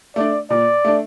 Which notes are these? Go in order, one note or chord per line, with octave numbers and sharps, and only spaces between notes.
A3 D4 D5
A#2 D5
A3 D4